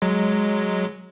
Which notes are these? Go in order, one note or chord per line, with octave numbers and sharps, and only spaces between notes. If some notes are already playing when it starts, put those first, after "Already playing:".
F#3 G#3